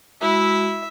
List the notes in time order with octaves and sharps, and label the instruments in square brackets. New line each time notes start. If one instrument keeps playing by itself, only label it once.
[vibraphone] G#3 F#4 [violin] E4 [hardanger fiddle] E5